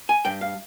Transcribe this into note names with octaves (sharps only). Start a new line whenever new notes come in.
G#5
G2 G5
F5